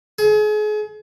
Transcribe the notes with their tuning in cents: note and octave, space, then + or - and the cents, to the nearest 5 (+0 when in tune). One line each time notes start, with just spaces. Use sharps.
G#4 +35